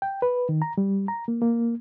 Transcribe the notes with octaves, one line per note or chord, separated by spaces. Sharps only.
G5
B4
D#3
A#5
G3
A#5
A#3
A#3